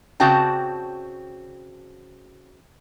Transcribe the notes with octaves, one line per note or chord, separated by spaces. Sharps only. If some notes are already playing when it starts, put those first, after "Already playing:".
C#3 C4 F#4 D5 G5 A5